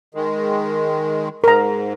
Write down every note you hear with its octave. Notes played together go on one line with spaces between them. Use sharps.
D#3 G#3
G#2 A#4 A#5